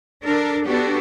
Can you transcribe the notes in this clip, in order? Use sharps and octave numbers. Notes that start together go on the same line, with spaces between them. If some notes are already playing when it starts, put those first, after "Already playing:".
D4 A4 A#4
B3 D4 F#4 G4 A4